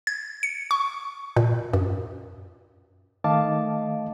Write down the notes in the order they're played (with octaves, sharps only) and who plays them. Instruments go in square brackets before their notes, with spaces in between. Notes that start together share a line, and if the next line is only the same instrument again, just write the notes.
[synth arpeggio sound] G#6
C#7
C#6
A#2
F#2
[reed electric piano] D#3 A3 D#5 F5 A5 D6